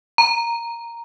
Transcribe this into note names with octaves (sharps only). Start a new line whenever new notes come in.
A#5